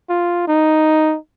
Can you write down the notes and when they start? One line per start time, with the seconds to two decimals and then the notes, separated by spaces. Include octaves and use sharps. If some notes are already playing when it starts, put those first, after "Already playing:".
0.09 F4
0.48 D#4